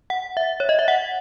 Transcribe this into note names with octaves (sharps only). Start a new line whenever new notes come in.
F#5
E5
C#5
D#5
E5
F#5